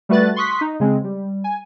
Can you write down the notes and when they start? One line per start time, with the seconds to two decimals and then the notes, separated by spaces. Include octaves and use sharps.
0.09 G3 A3 F#4 B4 F#6 A6
0.36 C6 C#6 D#6 F#6 B6
0.61 D#4
0.80 C#3 G#3 C4
1.04 G3
1.44 G#5